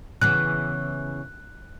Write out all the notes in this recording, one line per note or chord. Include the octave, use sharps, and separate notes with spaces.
C#3 E3 B3 F#6